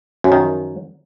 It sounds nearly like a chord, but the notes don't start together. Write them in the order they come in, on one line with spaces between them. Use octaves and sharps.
F#2 F3 D#3